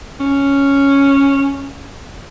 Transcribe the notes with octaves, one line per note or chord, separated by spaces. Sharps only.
C#4